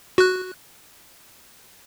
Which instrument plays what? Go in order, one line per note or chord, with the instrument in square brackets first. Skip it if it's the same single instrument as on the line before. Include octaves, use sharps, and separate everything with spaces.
[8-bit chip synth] F#4 F#6